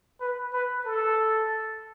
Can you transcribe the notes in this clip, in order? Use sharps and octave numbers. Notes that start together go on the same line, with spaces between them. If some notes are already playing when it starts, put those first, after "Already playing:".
B4
B4
A4